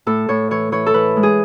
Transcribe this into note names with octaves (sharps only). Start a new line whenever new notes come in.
A2 A4
A2 C#5
E3 C#5
E3 C#5
A4
E3 B4
G#3
G#4